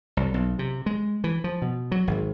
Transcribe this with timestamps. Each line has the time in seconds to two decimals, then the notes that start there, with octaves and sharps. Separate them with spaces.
0.17 C2
0.34 B1
0.59 C3
0.86 G#3
1.24 E3
1.44 F3
1.62 B2
1.92 F#3
2.07 G#1